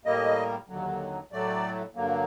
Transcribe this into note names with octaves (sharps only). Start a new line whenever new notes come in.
A2 G3 A#3 D#5
D#2 D3 F#3
A2 F#3 A3 D5
G2 D3 F#3 A#3